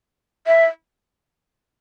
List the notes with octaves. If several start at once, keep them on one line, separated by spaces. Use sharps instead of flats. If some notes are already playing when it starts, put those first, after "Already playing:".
E5